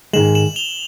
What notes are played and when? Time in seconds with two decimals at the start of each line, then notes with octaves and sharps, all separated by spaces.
0.13 G#2 D#3 G#3 E7 F#7
0.35 E7 F#7
0.56 F7 G7